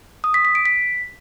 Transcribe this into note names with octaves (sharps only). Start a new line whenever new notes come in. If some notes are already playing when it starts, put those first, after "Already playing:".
D#6
B6
B6
D7
B6